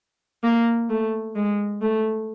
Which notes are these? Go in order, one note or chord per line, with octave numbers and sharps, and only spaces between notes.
A#3
A3
G#3
A3